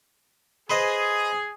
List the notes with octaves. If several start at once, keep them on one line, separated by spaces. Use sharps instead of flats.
G#4 B4 C5 D#5